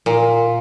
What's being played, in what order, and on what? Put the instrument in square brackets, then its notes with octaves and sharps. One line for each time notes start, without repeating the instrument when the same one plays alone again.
[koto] A#2